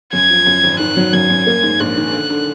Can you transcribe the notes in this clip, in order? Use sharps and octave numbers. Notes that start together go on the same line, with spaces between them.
F#2 G#6
F3
F#2
G#1
D#3 F#6
F#3
F#2 G#6
F#2
A#3
G#2
A#1 F#6
D#3
D3
D3